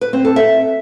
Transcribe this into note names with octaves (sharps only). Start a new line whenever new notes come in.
B4
C4
A4
E5